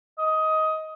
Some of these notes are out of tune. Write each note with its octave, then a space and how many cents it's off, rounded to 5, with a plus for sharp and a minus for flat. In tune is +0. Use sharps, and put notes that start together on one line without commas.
D#5 +15